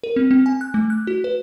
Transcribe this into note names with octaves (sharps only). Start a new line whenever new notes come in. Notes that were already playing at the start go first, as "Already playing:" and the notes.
A#4
C4
C4
G#5
F#6
A3
F#6
F#4
B4